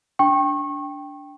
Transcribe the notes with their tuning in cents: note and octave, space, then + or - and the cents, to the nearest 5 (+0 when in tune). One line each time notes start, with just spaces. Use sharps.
D4 -15 G5 +0 C#6 -30